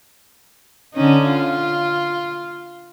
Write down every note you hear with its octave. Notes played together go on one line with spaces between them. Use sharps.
D3 C#4 D#4
F4